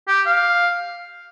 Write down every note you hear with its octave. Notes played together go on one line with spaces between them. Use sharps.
G4
F5